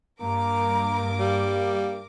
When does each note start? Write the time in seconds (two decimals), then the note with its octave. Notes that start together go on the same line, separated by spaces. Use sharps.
0.21 G2 A#3 A#4 A#5 D6
1.19 G3 F5